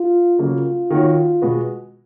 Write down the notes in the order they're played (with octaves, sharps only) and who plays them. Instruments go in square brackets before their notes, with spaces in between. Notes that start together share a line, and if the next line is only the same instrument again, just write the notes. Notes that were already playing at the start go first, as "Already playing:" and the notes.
Already playing: [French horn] F4
[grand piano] C#3 F#3 A#3 [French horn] F4
[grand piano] D#3 A#3 D#4 F#4 C#5
B2 G#3 B3 F#4 B4